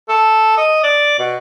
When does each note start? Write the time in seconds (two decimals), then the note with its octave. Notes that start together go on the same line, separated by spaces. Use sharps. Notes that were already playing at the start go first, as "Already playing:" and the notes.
0.09 A4
0.57 D#5
0.84 D5
1.19 B2